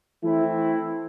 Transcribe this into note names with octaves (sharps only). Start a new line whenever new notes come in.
E3 A3 C4 E4